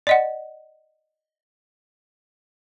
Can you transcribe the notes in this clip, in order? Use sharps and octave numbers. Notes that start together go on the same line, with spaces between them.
D5 D#5 F#5